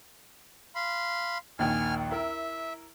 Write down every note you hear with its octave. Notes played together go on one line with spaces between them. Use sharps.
F5 B5 C6
A#1 D#2 D#3 G#5 F6
E4 A#4 E5